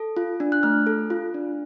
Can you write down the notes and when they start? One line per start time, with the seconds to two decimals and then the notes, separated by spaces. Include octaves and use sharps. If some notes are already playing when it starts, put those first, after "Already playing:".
Already playing: A4
0.17 F4
0.40 D4
0.52 F#6
0.63 A3 F6
0.87 A4
1.10 F4
1.34 D4